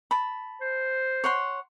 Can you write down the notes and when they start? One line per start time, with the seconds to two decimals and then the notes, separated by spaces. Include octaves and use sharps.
0.11 A5 B5
0.61 C5
1.24 C#5 F#5 C6